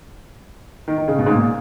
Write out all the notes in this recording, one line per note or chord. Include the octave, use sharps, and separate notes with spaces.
D#3
D#3
C#3
B2
G#2
A#2